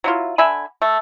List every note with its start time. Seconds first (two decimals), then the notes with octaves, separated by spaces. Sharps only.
0.04 F#3 E4 F4
0.38 D3 E5 G#5 B5
0.82 A3